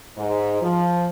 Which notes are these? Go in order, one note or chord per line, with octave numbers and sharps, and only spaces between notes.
G#2
F3